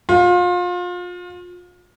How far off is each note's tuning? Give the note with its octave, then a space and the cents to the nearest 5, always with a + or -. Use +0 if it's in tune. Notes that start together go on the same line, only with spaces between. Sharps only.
F4 +30